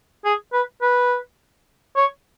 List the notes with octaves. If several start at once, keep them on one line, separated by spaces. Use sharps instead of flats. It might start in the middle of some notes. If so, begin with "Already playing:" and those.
G#4
B4
B4
C#5